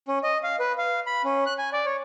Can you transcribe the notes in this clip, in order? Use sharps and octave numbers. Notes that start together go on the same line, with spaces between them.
C#4
D#5
F5
B4
F5
B5
C#4
F#6
G#5
D5
C#5